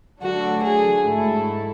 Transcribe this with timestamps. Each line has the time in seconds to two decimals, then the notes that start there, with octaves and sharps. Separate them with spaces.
0.21 D3 F#3 A3 D4 F#4 A4
0.62 G#4
1.03 G#2 F#3 A3 E4 A4